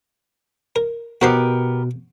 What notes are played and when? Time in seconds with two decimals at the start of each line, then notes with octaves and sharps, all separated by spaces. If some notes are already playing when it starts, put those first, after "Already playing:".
0.76 A#4
1.22 B2 B3 F#4 G4 A#4 C5 C6